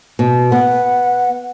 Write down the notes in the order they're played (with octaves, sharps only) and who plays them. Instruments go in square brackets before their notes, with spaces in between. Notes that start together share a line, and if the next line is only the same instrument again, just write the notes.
[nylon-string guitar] B2
[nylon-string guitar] B3 [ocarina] F#5